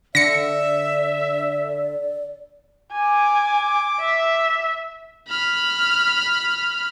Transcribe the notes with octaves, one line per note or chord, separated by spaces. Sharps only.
D3 D5 E5 A#6 C#7
G#5 D6
E5
B5 F6